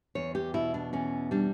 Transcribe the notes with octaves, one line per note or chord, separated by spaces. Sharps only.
E2 C#5
G4
B2 E4
D4
E2 C#4
G3 D4